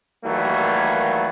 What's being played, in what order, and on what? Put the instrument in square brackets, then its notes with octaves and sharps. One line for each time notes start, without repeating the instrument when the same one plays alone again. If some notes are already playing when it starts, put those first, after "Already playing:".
[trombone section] D#3 E3 F#3 G3 A3 A#3